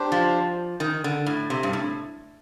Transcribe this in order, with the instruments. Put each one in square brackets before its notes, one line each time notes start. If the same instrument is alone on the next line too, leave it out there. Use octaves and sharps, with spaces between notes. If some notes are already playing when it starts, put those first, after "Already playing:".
Already playing: [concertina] D4 G4 C5
[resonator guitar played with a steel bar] F3
D#3
D3
A2
C3
G2
A2